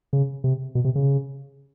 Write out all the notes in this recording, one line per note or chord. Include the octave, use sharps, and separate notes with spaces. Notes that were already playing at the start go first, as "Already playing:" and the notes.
C#3
C3
B2
C3
C#3